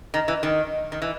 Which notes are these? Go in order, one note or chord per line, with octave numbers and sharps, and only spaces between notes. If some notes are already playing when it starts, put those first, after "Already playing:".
D#3
E3
D#3
D#3
E3